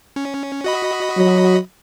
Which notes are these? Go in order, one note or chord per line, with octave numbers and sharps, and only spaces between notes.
C#4
F#4 D#5 B5
F#3